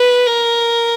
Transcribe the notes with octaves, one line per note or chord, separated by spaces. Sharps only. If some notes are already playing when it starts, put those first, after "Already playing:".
Already playing: B4
A#4